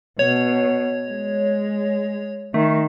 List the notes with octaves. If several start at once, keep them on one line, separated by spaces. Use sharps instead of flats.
B2 C#5
G#3
D#3 A3